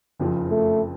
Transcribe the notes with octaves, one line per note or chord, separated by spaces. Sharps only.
F#1 F2 C#3 F3
A3